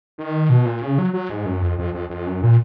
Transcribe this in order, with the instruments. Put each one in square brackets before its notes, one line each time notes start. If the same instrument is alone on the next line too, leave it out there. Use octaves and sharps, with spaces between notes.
[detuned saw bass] D#3
B2
A#2
C#3
F#3
F#3
G#2
F#2
F2
F2
F2
F2
F#2
A#2